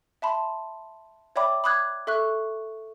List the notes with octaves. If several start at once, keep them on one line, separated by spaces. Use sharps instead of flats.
E5 A5 B5 C6
C#5 D5 E5 G5 B5 D6
B5 D6 D#6 F#6 G#6
A4 E5 C#6 F#6